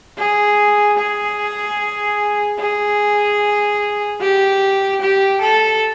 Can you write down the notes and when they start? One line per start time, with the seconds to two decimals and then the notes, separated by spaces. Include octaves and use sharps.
0.18 G#4
0.98 G#4
2.60 G#4
4.21 G4
5.01 G4
5.42 A4